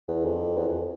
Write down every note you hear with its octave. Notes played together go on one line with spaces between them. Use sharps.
E2
F2
E2
F2